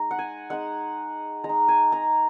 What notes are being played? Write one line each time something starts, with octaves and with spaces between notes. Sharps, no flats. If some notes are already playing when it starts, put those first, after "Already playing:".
Already playing: G#3 D#4 A#5
F#5
G#5
G#3 D#4 F#5
G#3 A#5
D#4
G#5
A#5